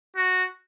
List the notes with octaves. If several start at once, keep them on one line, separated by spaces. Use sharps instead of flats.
F#4